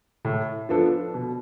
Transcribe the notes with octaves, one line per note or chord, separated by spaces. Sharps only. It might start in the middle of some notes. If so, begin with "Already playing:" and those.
A2
F3 B3 D4 A4
B2